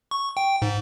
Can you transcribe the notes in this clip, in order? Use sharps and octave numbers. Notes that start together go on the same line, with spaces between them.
C#6
G5
G#2